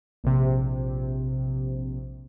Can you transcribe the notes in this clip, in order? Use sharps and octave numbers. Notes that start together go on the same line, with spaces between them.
A#1 C3